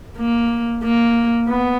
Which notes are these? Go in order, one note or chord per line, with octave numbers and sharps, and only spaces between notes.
A#3
A#3
B3